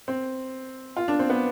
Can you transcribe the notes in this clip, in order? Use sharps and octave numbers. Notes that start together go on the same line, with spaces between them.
C4
F4
D4
C4
B3